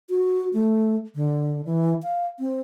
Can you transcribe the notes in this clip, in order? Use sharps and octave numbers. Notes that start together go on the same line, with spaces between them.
F#4
A3
D3
E3
F5
C4